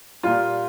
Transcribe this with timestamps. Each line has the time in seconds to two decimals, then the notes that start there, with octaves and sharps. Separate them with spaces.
0.23 A#2 G3 F4